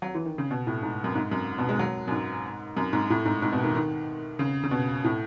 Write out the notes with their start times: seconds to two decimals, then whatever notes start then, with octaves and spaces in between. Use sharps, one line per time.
0.02 F#3
0.15 E3
0.26 D#3
0.38 C#3
0.51 B2
0.67 A2
0.82 G#2
1.04 F#2
1.15 G#2
1.31 F#2
1.58 B2
1.69 G#3
1.79 F#3
2.08 F#2
2.12 G#2
2.77 F#2
2.93 G#2
3.10 A2
3.25 G#2
3.42 G#2
3.52 B2
3.64 D#3
3.75 D#3
4.39 C#3
4.63 C#3
4.71 B2
5.04 A2